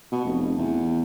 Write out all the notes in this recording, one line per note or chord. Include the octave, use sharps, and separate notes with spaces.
B2
F1
E2